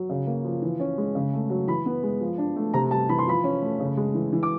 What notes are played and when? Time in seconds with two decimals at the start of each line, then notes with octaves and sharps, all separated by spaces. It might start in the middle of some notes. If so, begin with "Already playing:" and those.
Already playing: F#3
0.10 C#3
0.27 A#3
0.45 F3
0.62 E3
0.80 C#4
0.98 G#3
1.15 C#3
1.33 A3
1.50 F#3
1.68 E3 B5
1.86 B3
2.03 G#3
2.21 F3
2.38 D4
2.56 A3
2.74 C3 A#5
2.91 G3 A5
3.09 E3 B5
3.19 C6
3.27 F3 B5
3.44 C#4
3.62 A3
3.80 C#3
3.97 G#3
4.14 E3
4.33 E3
4.43 D6